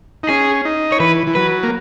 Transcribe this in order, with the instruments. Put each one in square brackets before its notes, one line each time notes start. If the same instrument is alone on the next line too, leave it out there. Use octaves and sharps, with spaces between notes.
[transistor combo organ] D#4
[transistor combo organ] C#4 [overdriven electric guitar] G#4
[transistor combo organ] D#4
[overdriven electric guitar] C#5
[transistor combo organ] E3 [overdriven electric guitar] B4
[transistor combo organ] E3
[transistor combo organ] F#3 [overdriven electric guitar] B4
[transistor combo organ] A#3